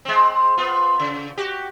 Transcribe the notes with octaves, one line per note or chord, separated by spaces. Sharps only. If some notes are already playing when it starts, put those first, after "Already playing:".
G#3 C4
B3 F4
C#3
F#4 G4